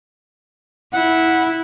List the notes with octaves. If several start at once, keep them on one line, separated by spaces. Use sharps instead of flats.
E4 F#5